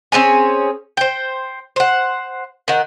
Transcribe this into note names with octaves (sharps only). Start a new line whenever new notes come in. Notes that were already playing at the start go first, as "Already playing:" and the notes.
C4 C#4 G#4 G#5
C5 G5
C5 F#5
D#3 F#5